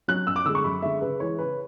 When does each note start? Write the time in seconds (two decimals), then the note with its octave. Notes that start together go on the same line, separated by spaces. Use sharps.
0.08 F#3 C#4 F#6
0.27 F#2 E6
0.36 D6
0.46 D3 G#3 E6
0.55 C#6
0.64 F#2 B5
0.82 D3 G#3 E5
1.02 C#3 B4
1.20 E3 G#3 C#5
1.39 C#3 B4